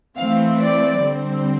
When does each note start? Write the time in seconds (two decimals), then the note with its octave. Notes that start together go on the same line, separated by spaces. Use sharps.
0.17 E3 A3 C4 F5
0.60 D5
1.02 D3 G3 C4